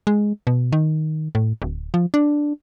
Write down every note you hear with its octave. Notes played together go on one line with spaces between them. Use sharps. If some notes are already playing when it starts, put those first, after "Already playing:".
G#3
B2
D#3
A2
D1
F3
D4